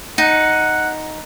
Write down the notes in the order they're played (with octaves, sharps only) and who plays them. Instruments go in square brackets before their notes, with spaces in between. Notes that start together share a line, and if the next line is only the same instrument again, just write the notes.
[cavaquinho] D#4 [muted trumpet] F#5